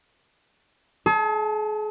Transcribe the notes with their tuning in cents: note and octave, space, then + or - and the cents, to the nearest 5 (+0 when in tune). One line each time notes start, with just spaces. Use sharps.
G#4 +40 A5 +0